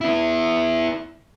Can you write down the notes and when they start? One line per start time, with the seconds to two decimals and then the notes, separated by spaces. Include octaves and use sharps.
0.01 B3 E4